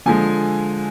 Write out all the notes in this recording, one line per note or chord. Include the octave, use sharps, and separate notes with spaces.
D3 F3 G#3 G#5